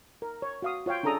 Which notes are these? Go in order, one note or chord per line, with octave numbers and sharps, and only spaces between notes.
A#4
C#5
F#4 F5 D#6
F4 C#5 F5 G5
C#4 D4 G#4 A4 A#5 D#6